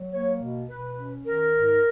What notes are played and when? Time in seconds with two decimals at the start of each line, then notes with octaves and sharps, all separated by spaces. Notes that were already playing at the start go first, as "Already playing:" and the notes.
Already playing: F#3
0.12 A#3 C#5
0.41 B2
0.68 B2 B4
0.97 C#4
1.25 D#3 A#4
1.53 G#2